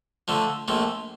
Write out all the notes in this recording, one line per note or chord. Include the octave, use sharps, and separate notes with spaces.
D3 F3 A3
A#1 A#2 F3 A3